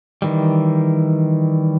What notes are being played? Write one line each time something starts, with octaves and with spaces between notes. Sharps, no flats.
D#3 E3 G3